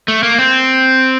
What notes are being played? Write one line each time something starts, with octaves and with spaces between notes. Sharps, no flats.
A3
A#3
C4